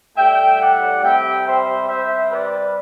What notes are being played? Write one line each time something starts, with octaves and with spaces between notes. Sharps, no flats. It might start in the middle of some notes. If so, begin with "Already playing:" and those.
A2 G3 E5 G5
D5 F#5
C3 G3 E5 G5
C5 E5
C3 G3 C5 E5
B4 D5